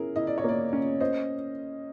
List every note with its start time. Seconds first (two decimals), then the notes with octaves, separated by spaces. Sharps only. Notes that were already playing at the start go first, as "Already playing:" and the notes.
Already playing: C#4 E4 G#4 A#4
0.16 E4 D#5
0.27 D5
0.38 C#5
0.44 A#3 D5
0.73 C#4
1.00 C5 D#5